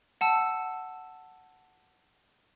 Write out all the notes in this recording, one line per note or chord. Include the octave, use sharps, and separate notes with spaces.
F#5 A5 E6